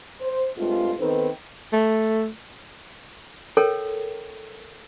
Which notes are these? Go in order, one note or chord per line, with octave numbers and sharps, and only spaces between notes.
C5
G2 G#3 A3 C4 F4
D#3 B3 C4 D#4 A4 B4
A3
A4 A#4 C#5 G5